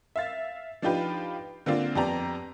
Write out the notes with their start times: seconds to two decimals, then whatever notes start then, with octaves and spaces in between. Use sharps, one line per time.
0.16 E5 F5 A6
0.82 F3 D4 D#4 F4 G4 B4
1.66 D3 A#3 C4 D4 F4 D5
1.95 F2 B3 G4 D5 A#5